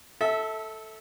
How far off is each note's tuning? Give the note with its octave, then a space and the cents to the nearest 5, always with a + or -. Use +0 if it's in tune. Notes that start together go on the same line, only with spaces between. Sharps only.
A4 +0 E5 -25